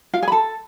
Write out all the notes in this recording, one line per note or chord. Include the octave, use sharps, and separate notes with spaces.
F4 F5
G#4 G#5
B5
A4 A5